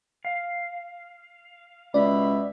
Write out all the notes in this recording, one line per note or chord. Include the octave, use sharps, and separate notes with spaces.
F5
C#2 B2 D5 E5 B5